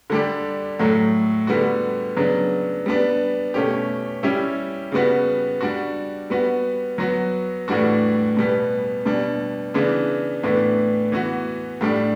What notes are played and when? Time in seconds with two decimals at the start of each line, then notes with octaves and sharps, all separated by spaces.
0.10 D3 G3 D4 G4
0.79 A2 F#3 A3
1.47 D3 G3 B3 F#4
2.17 C#3 F#3 B3 D4
2.86 G3 B3 D4
3.54 B2 A3 C#4 G4
4.23 G3 C#4 E4 G4
4.92 C#3 G3 B3 F#4
5.61 G3 D4 F#4
6.30 G3 B3 F#4
6.98 F#3 B3 F#4
7.68 A2 E3 G3 D4 F#4
8.37 B2 G3 B3
9.05 B2 G3 D4
9.74 C#3 E3 B3 D4
10.43 A2 E3 B3 D4
11.12 E3 B3 F#4
11.81 A2 G3 D4